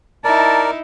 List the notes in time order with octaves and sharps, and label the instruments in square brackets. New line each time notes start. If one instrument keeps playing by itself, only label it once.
[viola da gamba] D#4 E4 [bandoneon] A#4 D5 [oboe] A5 [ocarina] A#5